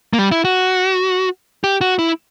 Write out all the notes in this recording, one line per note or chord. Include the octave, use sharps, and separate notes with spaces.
A#3
G3
E4
F#4
G4
F#4
E4